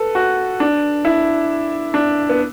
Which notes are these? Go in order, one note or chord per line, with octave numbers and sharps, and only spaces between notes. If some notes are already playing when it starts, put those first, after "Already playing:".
Already playing: A4 B4
F#4
D4
E4
D4
B3